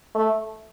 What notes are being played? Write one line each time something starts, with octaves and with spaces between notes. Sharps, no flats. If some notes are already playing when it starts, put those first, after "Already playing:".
A3